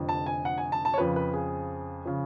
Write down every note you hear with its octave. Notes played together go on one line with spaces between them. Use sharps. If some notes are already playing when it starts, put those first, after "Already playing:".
Already playing: F1 F2 D3
A5
G#5
F#5
G#5
A5
A5
C#5
F2 C#3 F3 B4
B4
G#4
C#3 F3